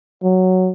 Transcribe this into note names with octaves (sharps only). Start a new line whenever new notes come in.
F#3